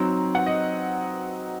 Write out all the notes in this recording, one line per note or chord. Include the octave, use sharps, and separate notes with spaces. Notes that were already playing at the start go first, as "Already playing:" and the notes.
Already playing: F#3 C4 D#4 A#5
F#5
D#5